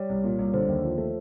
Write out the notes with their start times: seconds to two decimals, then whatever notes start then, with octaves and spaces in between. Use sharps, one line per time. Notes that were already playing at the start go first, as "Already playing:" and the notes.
Already playing: G3 C#5
0.09 C2
0.24 A#2
0.39 C2
0.53 D3 C5
0.68 D#2
0.83 F3
0.98 A3